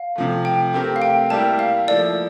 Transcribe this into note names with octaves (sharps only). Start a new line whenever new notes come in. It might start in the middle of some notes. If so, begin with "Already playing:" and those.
Already playing: F5
C3 F3 A3
G5
A3 C4 G4 A#4
F5
G5
G3 A#3 E4 G4 A#4 A5
F5
F3 A#3 E4 A4 D5